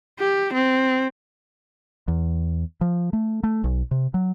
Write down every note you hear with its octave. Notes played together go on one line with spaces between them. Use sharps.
G4
C4
E2
F3
A3
A3
B1
C3
F#3